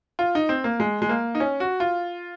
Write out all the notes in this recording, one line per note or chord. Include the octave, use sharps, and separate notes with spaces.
F4
D#4
C4
A#3
G#3
G#3
A#3
D#4
C#4
F#4
F4